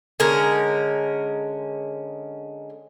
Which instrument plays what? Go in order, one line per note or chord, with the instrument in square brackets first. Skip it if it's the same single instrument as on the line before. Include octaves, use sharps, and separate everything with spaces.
[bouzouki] D3 G#3 C#4 A#4